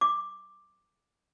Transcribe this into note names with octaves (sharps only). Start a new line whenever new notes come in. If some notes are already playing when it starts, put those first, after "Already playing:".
D6